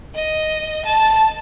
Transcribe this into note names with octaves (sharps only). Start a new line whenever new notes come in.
D#5
A5